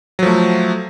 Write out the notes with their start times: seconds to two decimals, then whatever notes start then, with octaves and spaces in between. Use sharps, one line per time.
0.19 F#3
0.23 F3
0.26 A3